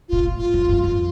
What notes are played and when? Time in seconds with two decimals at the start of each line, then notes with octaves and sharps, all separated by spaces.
0.09 A#2 F4
0.23 A2
0.38 F4
0.54 F2
0.69 G2
0.83 F2 F4